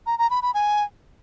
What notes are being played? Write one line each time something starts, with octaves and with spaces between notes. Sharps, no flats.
A#5
A#5
B5
B5
G#5